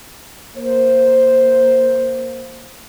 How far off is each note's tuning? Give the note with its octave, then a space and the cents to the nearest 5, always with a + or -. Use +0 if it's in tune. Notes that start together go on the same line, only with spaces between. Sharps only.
A#3 +0 C5 +0